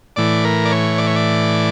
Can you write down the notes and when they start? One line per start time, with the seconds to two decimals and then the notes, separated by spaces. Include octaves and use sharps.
0.16 A2 E3 D5
0.45 A#4
0.66 D5
0.72 C#5
0.98 D5
1.07 C#5
1.16 D5